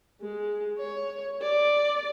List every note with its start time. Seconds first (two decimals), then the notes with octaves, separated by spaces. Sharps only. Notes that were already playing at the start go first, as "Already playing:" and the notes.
0.22 G#3
0.78 C#5
1.42 D5